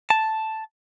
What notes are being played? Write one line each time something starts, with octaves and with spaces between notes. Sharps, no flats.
A5